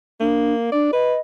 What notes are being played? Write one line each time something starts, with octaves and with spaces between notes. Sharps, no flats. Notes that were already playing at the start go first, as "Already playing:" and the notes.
A#3 D4
D4 D5
B4 D#5